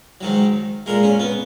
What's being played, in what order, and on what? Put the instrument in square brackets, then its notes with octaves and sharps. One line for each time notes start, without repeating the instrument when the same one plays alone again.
[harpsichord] G#2 D#3 F#3
A#2 G#3 A#4
C#4
B3